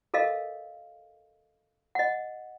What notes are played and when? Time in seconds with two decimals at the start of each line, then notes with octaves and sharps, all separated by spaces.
0.14 A4 A#4 D#5 F5
1.95 D#5 F#5